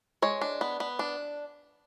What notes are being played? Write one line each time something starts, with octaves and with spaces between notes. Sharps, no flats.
G#3 C#5
D4
B3
B3
D4